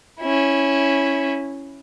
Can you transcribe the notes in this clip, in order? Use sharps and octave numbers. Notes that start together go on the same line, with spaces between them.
C#4 E4